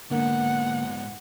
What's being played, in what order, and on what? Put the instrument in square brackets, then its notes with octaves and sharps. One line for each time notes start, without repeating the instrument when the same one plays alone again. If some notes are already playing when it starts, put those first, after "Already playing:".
[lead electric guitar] G#2 B3 [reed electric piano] D3 A#3 [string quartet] F#5